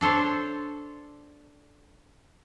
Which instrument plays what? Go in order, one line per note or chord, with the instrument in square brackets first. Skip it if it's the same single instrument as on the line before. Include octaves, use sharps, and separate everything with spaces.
[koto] D4 A4 C5 C#5